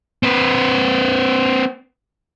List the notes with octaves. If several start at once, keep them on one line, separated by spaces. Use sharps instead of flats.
C4 B4